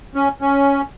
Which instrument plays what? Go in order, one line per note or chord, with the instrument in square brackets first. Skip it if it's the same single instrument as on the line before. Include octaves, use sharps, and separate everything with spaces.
[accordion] C#4
C#4